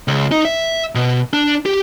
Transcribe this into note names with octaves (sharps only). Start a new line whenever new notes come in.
C#2
D#4
E5
B2
D4
G4